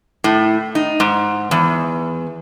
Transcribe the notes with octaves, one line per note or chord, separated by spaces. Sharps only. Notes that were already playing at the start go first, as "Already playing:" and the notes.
A2
D#4
G#2
E2